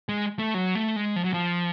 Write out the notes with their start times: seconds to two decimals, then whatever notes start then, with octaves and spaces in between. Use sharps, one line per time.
0.09 G#3
0.39 A3
0.54 F#3
0.75 A3
0.96 G#3
1.16 F3
1.24 F#3
1.34 F3